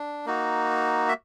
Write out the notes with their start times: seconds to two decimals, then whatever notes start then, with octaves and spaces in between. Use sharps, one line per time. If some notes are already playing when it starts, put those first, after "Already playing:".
Already playing: D4
0.26 A#3 D#4 F#4
1.09 E5